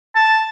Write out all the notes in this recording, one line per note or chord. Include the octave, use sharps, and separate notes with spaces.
A5